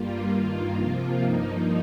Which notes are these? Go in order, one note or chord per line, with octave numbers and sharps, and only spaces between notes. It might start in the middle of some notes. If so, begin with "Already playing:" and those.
Already playing: G2 G3 A#3 F4
G2 D#3 A#3
C3 F3 A#3 F4
G2 F3 A#3 D#4